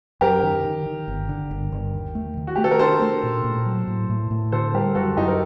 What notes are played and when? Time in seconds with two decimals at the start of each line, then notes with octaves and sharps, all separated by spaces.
0.21 F#2 G4 A#4
0.43 D#3
0.64 D#3
0.86 D#3
1.08 G1
1.29 D3
1.51 G1
1.72 G1
1.94 D#2
2.15 A3
2.37 D#3
2.47 F#4
2.56 A3 G4
2.64 A4
2.71 A#4
2.79 D4 A4 C5
3.02 A3
3.23 A#2
3.44 A#2
3.66 F#3
3.88 A2
4.10 A2
4.31 A2
4.52 D3 A4 C5
4.74 G3 G4 A#4
4.95 F#2 F#4 A4
5.17 F#2 D#4 G4
5.28 A#4